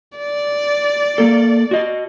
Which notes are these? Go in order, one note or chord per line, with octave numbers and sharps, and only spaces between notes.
D5
A#3 A4
F#4 D#5